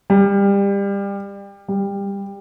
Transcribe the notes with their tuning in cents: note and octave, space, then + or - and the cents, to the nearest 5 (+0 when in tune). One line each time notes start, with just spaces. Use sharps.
G3 +25
G3 +20